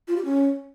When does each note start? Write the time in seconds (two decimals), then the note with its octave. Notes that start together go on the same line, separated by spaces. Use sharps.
0.08 F4
0.16 G4
0.25 C#4